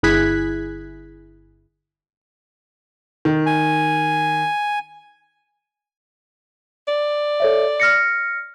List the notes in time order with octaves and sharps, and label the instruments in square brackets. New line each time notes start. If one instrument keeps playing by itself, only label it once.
[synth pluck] G1 E4 G#4 F#6 G#6 B6
[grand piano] D#3
[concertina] G#5
[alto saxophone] D5
[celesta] A4 C#5 E5
F6 A#6 C#7